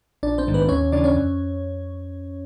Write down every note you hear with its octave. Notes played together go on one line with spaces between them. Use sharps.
A#1 D4 D5
C4 C5
G#2 D#3 G#3
B3 B4
D#2 C#4 C#5
C#3 E3 D4 D5
C#4 C#5
F2